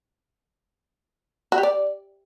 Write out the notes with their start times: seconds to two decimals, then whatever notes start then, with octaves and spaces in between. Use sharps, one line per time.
1.52 F#4
1.58 G4
1.63 D5